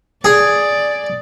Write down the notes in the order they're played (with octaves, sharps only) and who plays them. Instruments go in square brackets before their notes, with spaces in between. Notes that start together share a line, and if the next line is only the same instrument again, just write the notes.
[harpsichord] G#4 [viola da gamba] D5